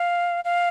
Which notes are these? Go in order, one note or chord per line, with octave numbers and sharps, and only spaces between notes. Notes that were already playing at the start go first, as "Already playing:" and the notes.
Already playing: F5
F5